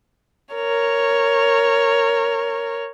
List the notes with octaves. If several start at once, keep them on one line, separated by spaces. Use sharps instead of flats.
A#4 C#5